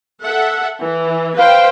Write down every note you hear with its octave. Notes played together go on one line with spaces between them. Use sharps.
A4 E5 F#5
E3
B4 C5 F5 G5